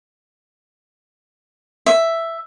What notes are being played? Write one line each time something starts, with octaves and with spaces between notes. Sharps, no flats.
E5